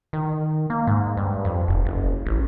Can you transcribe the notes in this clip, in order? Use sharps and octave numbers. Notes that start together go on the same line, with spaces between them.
D#3
A#3
G#2
G2
F2
F1
F#1
A1